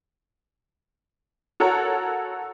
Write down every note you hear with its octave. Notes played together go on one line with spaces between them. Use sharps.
F#4 A4 A#4 C#5 F#5 A#5